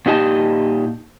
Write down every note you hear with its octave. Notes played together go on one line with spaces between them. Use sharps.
A#2 D#4 G4 D#5 A5